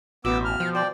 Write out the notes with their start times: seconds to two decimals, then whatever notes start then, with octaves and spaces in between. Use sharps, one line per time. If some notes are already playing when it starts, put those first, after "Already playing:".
0.25 A1 B2 B3 G5 D6 E6
0.45 F6
0.60 F3 G5
0.75 C5 D5 G5